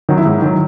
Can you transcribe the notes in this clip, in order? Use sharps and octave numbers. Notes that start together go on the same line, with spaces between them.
D#3 F#3 F#4
E4
G#2
D#3 F#3